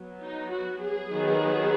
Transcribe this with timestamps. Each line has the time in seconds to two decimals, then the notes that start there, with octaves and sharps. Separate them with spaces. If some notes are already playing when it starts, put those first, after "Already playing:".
Already playing: F#3 B3
0.22 D#4
0.51 F#4
0.80 G#4
1.10 D#3 F#3 B3